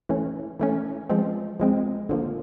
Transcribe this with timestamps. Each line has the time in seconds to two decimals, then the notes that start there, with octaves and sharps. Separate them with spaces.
0.09 E3 A3 C#4
0.60 E3 A3 C#4
1.09 F3 G#3 C4
1.60 F3 G#3 C4
2.09 D3 F3 A#3